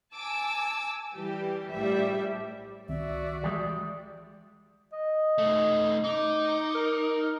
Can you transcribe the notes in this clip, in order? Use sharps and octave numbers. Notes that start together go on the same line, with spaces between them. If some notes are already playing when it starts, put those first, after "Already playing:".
G#5 A5 D6 E6
E3 G3 G4
A#1 A2 G3 E5
C2 D#3 C4 F#4 D5 E5
E3 G3 G#3
D#5
A3 D#4
D#4 D6
A#4